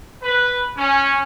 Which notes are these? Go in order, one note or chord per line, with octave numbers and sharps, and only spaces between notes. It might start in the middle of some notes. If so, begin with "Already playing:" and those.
B4
C#4